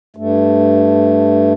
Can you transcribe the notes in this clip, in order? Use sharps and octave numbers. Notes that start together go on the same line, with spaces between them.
G2 A3